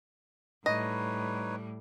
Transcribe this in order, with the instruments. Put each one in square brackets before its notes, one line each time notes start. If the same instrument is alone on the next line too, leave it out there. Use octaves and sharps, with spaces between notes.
[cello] A2 G3 [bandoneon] D#4 B4 C#5 [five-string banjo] D#5